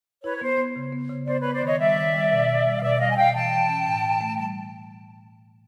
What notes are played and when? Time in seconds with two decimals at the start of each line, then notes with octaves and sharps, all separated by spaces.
0.23 E4 B4 C#5
0.36 B4
0.41 B3 C5
0.58 B3
0.76 C#3
0.92 B3
1.10 C#3
1.27 B3 C5 D5
1.40 B3 B4 C#5
1.53 C5 D5
1.61 D#3 C#5 D#5
1.79 G3 D5 E5
1.96 D#3
2.14 G3
2.31 B2
2.47 B2
2.65 G3
2.78 F5
2.82 B2 D5 E5
2.96 E5
3.00 G3 D#5 F5
3.11 G#5
3.16 B2 F5 G5
3.34 E3 G5 A5
3.52 E3
3.68 C#4
3.85 A2
4.03 E3
4.21 A3
4.38 G3 A5